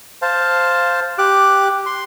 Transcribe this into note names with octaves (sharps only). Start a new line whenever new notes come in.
C5 F5 A5
G4 D6 F#6
C6